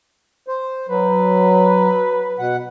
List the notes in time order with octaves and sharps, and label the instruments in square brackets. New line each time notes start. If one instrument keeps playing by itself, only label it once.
[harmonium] C5
[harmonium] F#3 [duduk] B4
[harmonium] B2 F#5